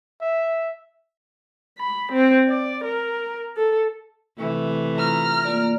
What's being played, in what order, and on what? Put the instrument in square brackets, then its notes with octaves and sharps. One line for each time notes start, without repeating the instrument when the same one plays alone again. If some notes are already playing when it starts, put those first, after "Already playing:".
[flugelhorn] E5
[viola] B5
C4
D5
A#4
A4
[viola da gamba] C3 E3 A3
[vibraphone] F4 E5 [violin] A#5 F6
[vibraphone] A#3 F4 D5